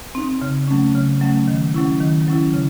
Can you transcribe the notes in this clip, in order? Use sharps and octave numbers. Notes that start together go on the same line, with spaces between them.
C4 D#4
C#3
F#3 A3 C#4
C#3
F#3 A3 C#4
D#3
F#3 C#4 E4
D#3
F#3 C#4 E4
C#3